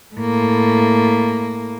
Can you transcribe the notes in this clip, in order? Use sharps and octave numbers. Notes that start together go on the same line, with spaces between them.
A2 A#3